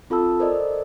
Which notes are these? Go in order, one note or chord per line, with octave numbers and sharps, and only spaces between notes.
C4 F4 A4 A5 E6
A4 A#4 C5 D5 D#5